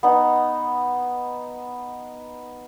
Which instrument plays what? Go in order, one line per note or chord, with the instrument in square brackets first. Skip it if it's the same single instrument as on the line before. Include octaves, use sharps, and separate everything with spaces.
[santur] B3 D#4